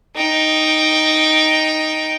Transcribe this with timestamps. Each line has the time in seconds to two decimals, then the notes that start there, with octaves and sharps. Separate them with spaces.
0.16 D#4 G5